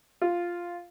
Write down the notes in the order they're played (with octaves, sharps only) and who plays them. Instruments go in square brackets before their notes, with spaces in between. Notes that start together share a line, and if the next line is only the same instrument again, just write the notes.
[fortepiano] F4